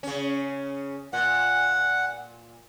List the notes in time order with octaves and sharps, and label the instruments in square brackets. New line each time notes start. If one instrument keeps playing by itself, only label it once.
[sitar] C#3 C#4
[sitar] A#2 [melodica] F#5